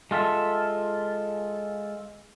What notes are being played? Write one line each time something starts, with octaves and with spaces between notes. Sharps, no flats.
G#3 F4 A4 E5